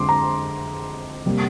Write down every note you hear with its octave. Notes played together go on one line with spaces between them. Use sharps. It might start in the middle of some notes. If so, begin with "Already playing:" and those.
Already playing: F2 D3 G#3 C6 D6
A#5
C3 G3 A#3